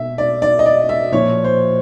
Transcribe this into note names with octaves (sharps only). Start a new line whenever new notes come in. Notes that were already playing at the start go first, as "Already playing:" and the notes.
Already playing: B2 E5
D5
D5
D#5
D5
E5
A#2 F3 C#5
C5